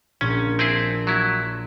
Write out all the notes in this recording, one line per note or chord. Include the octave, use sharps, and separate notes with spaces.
A#1 C#4
C4 E4 G#4
F#3 E4